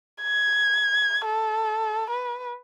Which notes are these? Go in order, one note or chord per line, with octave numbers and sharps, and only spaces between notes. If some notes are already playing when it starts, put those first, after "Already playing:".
G#6
A4
B4